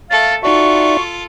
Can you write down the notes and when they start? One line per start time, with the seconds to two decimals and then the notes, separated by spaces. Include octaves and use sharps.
0.10 A3 A4 F5 A6
0.43 D#4 F4 F#4 A4 D5 E5 C#6